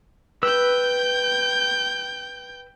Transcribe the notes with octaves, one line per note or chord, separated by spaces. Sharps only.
B4 G5 E6 G6